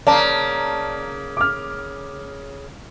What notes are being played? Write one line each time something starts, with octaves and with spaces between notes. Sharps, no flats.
C#3 A#3 D5 A5 A#5
D6 F6